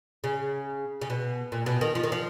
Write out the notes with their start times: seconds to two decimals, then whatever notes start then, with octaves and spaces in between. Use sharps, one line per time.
0.24 C#3
1.01 C#3
1.10 B2
1.52 A#2
1.66 B2
1.81 D#3
1.95 F3
2.03 D#3
2.12 F3